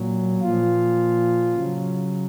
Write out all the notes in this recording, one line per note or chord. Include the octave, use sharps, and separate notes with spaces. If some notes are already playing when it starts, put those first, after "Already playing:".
Already playing: A#2 F#3
A#2 F3 F4
C#3 F#3